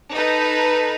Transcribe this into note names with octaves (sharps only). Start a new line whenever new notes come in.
D#4 A4 B4